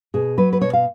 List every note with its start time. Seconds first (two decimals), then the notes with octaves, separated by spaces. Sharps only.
0.14 B2 G#4
0.38 F#3 B4
0.53 B4
0.61 B2 C#5
0.73 F5